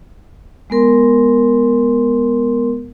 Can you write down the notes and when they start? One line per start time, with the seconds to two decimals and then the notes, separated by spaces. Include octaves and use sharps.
0.70 G#3 B3 A#4 C6